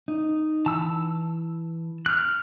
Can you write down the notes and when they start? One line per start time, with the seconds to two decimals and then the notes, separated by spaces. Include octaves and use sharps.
0.08 D#4
0.66 E3 A5 E6
2.06 F6 F#6